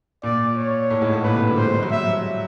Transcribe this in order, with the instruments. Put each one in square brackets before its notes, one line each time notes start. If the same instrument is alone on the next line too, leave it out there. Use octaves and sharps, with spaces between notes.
[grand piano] A#2 [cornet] D5
[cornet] C#5
[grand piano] A2
G#2
A2
[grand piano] A#2 [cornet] B4
[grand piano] C3
D3
[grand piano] G3 [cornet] C5
[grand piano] G#3
G3
F#3
[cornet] E5